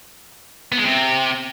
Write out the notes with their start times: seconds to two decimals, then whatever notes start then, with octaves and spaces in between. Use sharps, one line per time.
0.72 B3
0.78 G#3
0.84 C3